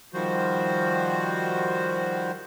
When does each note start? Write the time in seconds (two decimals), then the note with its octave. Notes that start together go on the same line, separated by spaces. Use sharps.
0.14 D#3 F3 G3 F#4 C5